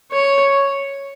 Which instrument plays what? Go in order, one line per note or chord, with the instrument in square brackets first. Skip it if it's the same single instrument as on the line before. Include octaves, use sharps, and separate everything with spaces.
[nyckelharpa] C#5